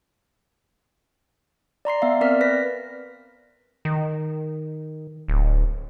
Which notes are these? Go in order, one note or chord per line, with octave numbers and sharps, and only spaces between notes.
D5 A#5 C6 C7
B3 E5 F5
C4 A#4 D5 F6 B6
B4 A#6 B6
D#3
D1